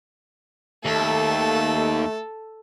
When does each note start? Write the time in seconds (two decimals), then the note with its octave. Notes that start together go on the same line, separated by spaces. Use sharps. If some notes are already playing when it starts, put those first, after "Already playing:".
0.85 D#2 A3 A4